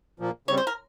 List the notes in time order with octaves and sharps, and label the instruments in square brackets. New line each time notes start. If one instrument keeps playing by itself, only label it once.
[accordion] A#2 F3 A#3
[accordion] C#3 G3 C4 [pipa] C#5
[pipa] C5
A#4